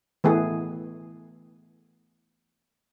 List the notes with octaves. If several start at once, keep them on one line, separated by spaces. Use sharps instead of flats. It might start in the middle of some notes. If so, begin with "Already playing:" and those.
E3 A3 B3 G#4